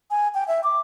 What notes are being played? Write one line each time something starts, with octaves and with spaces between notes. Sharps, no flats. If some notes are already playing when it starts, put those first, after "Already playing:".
G#5
G5
E5
D6